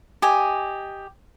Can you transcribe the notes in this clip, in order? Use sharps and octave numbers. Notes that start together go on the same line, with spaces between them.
G4 D#5 G#5